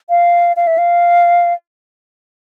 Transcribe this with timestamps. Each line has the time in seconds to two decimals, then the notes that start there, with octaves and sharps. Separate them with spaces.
0.09 F5
0.57 F5
0.67 E5
0.78 F5